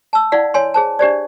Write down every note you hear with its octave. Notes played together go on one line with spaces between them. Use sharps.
A5 E6
E4 D5 F5 F#5
C#5 G#5 C6
G#4 C5 A5
D4 G4 C5 D5